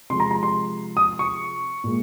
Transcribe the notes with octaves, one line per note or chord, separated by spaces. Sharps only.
C3 F3 G#3 C6
A#5
A#5
C6
D#6
C#6
A#2 G#3